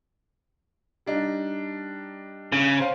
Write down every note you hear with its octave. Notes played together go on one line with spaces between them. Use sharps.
G3 D4 D#4
C#3
C5 C#5 F5